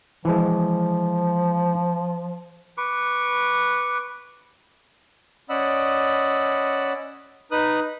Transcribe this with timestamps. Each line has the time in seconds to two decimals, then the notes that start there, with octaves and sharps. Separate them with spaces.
0.25 E3 F3 G#3
2.78 B4 C#6 D6
5.50 C#4 D5 D#5 F#5 B5 E6
7.51 D#4 B4 D#6 F#6